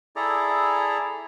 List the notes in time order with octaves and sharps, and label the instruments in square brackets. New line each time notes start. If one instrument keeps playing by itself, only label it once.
[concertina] E4 G#4 A4 D5 A#5